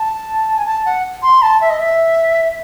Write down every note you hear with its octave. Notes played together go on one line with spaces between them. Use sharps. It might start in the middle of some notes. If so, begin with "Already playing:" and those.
Already playing: A5
G#5
A5
F#5
C6
A5
E5
D#5
E5